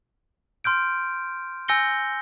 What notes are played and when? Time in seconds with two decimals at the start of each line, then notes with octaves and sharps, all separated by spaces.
0.64 C6 F6 G6 D7
1.68 G#5 E6 G6 A#6 C#7 G7